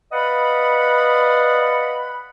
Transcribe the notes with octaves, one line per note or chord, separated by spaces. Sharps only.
B4 D5 D#5 F5 F#5 B5